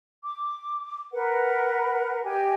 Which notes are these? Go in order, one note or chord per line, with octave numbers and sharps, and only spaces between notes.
D6
A#4 B4 F#5
G4 D#5 G5 G#5